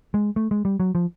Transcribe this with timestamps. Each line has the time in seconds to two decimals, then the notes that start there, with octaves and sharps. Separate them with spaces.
0.14 G#3
0.36 A3
0.51 G#3
0.65 G3
0.80 F#3
0.95 F3